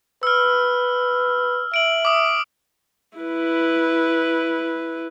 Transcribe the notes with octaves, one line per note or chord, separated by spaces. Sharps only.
B4 E6 F6
E5 D7 F#7
D6 D#6
E4 B4